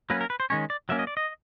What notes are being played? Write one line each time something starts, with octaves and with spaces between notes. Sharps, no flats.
F#3 A#3 C#4 B4
A#4
B4
C5
D#3 G#3 C#4 C#5
D5
F#3 A#3 C#4 E5
D#5
D5
D#5